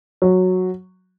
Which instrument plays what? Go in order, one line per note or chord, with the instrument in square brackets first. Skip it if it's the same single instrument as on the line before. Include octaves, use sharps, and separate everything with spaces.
[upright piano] F#3